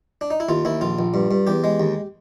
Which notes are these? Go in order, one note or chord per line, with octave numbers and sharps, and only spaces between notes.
D4
D#4
E4
D#2 F4
D#2 E4
A#1 F4
A#1
G2
G2
E2 G4
G#3
D#2